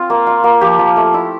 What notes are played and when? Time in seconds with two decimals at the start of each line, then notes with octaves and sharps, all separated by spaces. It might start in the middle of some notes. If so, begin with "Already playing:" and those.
Already playing: C4 F4
0.10 A#3
0.27 F4
0.44 A#3
0.61 F3 G4
0.79 F3
0.97 A3
1.14 E4